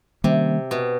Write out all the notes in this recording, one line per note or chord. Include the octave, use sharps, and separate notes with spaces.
C3 D#3 G3 A#3 C#4
B2